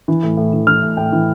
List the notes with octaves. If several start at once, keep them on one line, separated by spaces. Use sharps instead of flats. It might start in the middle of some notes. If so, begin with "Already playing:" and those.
E3
A2
A2
E3
E3 F6
A2
A2 G5
E3